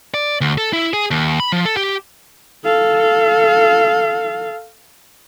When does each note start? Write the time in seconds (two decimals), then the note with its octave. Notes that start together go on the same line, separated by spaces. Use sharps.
0.14 D5
0.41 D2
0.58 A4
0.73 E4
0.93 G#4
1.11 D#2
1.40 B5
1.52 F3
1.65 A4
1.77 G4
2.65 A4 F5